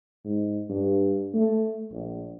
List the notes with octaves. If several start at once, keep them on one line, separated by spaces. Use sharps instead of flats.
G#2
G2
A3
A#1